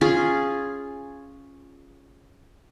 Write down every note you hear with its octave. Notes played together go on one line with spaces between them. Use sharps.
C#4 F4 G#4